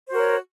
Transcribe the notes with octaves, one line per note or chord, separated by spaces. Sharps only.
F#4 A#4 C5 C#5